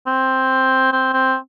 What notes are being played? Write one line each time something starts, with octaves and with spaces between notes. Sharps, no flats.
C4
C4
C4